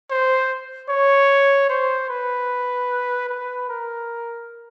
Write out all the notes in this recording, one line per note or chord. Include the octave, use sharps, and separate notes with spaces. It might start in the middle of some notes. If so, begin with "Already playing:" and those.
C5
C#5
C5
B4
B4
A#4